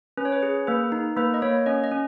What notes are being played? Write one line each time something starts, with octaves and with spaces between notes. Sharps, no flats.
C#4 B4
C#5
B4
G#4
A#3 B4
D#4
A#3 B4
D#5
A#3 C#5
C#4 D#5
D#5
C#4